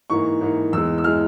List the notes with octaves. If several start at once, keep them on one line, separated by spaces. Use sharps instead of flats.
G#2 E3 A#3 C#6
G#2 E3 A#3
E2 E3 G#3 E6
E6
E3 G#3 F6